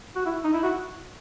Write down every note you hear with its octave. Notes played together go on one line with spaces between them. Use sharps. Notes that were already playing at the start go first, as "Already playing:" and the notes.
F#4
E4
D#4
E4
F#4